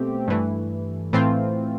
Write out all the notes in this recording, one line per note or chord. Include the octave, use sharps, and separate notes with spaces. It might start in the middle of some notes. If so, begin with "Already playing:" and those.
Already playing: B2 A3 C4 G4
G2 E3 A3
A2 E3 A3 C4 F4